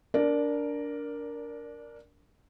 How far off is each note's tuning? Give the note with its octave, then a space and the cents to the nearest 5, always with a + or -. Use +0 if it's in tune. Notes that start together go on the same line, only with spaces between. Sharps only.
D4 -20 A#4 +0 D5 +0